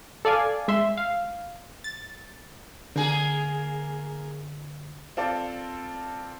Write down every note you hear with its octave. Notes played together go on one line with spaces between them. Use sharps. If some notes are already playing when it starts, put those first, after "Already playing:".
A4 D5 F5 G#5
G#3 E5 C6
F5
A6
D3 A#3 G#4
C4 F4 A4 D5